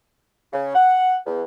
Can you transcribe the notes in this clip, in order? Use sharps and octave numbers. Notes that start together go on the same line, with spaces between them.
C#3
F#5
E2